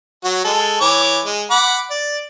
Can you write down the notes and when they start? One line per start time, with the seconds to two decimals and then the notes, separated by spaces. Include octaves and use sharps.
0.24 F#3 F#4
0.44 G#3 A4
0.81 E3 C#5 D6
1.25 G#3
1.50 F#5 B5 D6
1.90 D5